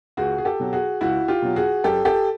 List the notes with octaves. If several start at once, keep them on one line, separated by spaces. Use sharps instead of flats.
C#2 F#4 G#4
G#4
G4 A4
B2 F#3
F#4 G#4
C#2 E4 F#4
F4 G4
B2 F#3
F#4 G#4
F#2 G4 A4
G4 A4